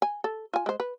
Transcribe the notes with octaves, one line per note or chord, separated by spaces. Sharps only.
G#5
A4
F4 G#5
G#3 C5
B4